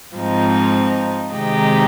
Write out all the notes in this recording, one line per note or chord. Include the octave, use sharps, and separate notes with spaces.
G#2 F3 C4 D#4
C3 D#3 G#3 D#4 G4